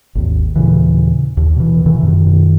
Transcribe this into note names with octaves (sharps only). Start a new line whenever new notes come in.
G#1 D#2
D#2 A#2 C#3 E3
D#2
B2 E3
B2 D#3 E3
F#2 B2 D#3